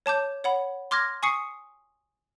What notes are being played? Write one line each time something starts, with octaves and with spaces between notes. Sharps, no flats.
C#5 A5 D6 G6
C#5 F#5 B5
C6 D6 F6 G#6 A#6
G#5 C#6 D#6 C7 C#7